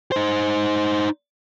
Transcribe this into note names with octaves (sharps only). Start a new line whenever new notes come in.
D#4 C5